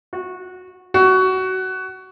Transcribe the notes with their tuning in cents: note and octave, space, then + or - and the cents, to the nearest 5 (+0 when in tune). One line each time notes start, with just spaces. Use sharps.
F#4 -15
F#4 +20